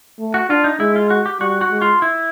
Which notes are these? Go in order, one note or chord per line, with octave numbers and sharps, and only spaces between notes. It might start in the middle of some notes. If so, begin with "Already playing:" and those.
A3
F#4
D4 F4
D#4
G#3 E4
F4
F#4
G4
G3 F#4
F#4
G#3
F4
E4